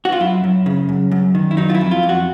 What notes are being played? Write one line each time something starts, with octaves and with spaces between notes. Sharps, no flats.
F#4
F4
F#2 E4
F#2
C#3
F#2
F#2
D#3
E4
F#3 D#4
F4
E4
F2
F4
F2
F#4